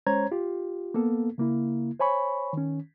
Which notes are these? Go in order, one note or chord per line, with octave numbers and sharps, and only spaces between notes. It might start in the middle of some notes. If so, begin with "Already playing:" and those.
G#3 C#4 C5 C#5 A#5 G#6
F4 G4
A#3 B3 A4
C#3 A#3 E4
C5 C#5 G#5 B5 C#6
D#3 C#4